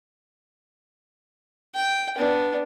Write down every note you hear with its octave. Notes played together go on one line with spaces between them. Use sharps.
G5
B3 D4